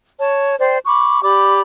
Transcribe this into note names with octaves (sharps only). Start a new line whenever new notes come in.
C#5 A5
C5 D5 G5
B5 C#6 D6
G4 D5 B5 D6